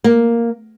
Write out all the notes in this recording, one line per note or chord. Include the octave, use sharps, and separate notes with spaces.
A#3